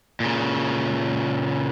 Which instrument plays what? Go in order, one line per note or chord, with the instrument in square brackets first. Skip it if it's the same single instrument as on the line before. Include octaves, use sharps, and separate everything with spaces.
[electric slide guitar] A#2 C#3